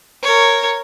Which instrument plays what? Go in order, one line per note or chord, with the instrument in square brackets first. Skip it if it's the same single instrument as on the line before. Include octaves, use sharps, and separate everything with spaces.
[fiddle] A#4 C#5